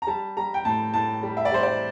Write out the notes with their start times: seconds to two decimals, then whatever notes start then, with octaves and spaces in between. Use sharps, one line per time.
0.02 A#5
0.07 G3 A5
0.37 G3 A#5
0.54 G5
0.65 A2 A5
0.94 A2 A5
1.23 G3
1.37 E5
1.45 D5
1.52 G3 C5
1.63 D5